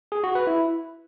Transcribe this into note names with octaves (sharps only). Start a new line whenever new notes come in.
G#4
F#4
B4
E4